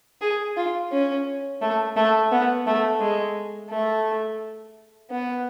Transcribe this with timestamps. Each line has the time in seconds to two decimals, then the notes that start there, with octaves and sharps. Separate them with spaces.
0.21 G#4
0.57 F4
0.92 C#4
1.62 A3
1.96 A3
2.32 B3
2.67 A3
3.00 G#3
3.70 A3
5.11 B3